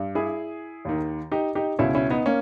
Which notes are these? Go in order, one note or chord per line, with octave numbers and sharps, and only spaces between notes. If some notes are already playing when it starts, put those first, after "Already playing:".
Already playing: G2
E4 G#4
D#2 D#3
D#4 G4
D#4 G4
C#2 B2 C#4 E4
C#4 E4
B3 D#4
A#3 C#4